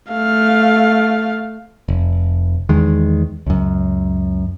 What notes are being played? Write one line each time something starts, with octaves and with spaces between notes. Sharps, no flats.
A3 F5
F1
E2 D#3 G#3
C#2 F#2